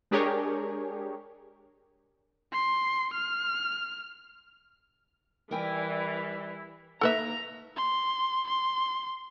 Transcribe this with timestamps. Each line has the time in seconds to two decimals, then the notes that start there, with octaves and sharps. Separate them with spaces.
0.11 G#3 D4 G4 G#4 A#4 C#5
2.53 C6
3.14 F6
5.51 E3 G3 E4 A#4 G5 G#5
7.01 D#2 A#3 A4 B4 E5 A#5
7.77 C6
8.47 C6